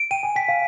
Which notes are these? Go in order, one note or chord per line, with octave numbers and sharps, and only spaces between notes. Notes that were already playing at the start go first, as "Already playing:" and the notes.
Already playing: D7
G5 D#7
G#5
G5 B6
F5